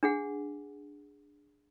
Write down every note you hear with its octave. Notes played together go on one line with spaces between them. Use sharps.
D4 G#4 F#5